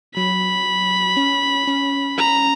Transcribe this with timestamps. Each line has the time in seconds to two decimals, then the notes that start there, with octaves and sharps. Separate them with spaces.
0.16 F#3 B5
1.17 C#4
1.67 C#4
2.18 A#5